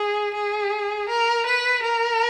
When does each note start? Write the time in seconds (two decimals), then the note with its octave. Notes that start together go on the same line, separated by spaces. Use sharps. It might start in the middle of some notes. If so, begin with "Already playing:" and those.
Already playing: G#4
0.35 G#4
1.09 A#4
1.46 B4
1.83 A#4